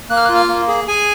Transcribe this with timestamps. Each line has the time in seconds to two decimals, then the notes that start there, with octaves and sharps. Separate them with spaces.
0.10 A#3 F#6
0.17 F6
0.25 F#6
0.29 F4
0.35 F6
0.48 A#3
0.68 G#4
0.88 G#4 G#5